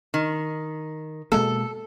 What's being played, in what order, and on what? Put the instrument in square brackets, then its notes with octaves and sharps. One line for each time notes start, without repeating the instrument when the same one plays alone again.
[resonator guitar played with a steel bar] D#3
[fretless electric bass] B2 G#3 A#3 [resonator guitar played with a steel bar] A4